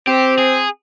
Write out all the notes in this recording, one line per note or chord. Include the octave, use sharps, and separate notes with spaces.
C4 G4
G#4